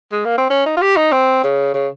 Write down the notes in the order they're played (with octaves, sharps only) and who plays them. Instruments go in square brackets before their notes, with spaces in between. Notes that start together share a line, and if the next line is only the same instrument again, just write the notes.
[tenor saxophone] G#3
A#3
C4
C#4
D#4
F4
G4
D#4
C4
C#3
C#3